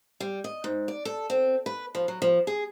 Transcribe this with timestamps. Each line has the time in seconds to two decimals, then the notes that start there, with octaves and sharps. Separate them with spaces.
0.20 G3
0.44 D#5
0.64 G#2
0.88 D5
1.05 A4
1.30 C4
1.66 B4
1.95 F3
2.08 F#3
2.22 F3
2.47 G#4